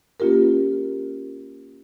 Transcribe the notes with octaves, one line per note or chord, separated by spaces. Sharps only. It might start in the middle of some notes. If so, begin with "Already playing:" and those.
A#3 C#4 F4 G4 A#4